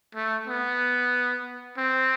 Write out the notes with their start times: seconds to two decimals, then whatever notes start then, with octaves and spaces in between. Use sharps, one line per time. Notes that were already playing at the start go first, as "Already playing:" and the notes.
0.15 A3
0.47 B3
1.77 C4